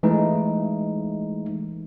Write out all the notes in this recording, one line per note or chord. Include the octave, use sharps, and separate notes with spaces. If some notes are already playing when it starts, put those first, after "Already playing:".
E3 G#3 A3 D#4